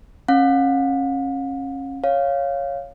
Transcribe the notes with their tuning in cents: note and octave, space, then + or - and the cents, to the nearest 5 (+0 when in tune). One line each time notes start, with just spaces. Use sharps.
C#4 -30 F5 +40
C#5 +0 F5 +0